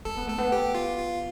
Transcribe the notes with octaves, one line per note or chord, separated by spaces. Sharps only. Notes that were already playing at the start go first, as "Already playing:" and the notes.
C4 A4
B3
A3 A4
B3
G4
F4
F4